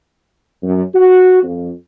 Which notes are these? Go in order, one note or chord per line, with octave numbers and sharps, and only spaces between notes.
F#2
F#4
F2